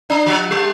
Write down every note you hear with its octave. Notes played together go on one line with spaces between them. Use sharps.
D4
F3
G3